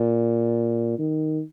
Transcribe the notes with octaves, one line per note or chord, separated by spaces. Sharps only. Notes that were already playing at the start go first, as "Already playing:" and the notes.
Already playing: A#2
D#3